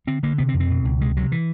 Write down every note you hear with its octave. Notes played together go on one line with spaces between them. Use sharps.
D3 C4
D3 A#3
C3 B3
C4
F2
C4
B2
C#2
C3 G#3
C3 F#3
E3